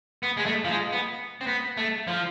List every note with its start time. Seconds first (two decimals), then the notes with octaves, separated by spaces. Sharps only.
0.23 B3
0.37 G#3
0.46 A3
0.65 F3
0.69 G#3
0.92 B3
1.41 C4
1.47 B3
1.77 A3
2.07 F3